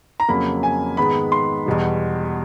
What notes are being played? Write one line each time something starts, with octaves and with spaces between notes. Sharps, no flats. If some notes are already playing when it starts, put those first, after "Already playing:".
A#5
F2 C#3 F#3 A#3 B5
G#5
G#2 D#3 G#3 B3 B5
C6
E2 B2 G3